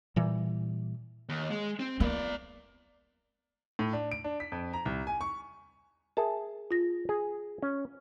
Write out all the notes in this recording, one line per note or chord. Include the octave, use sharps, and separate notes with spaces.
A#2 E3 G3
D#2
G#3
C4
A#3 B3 D5
A2
D4
D7
D4
B6
F2
A#5
C2
G#5
C#6
G#4 A#4 E5 A5
F4 A#6
G#4
C#4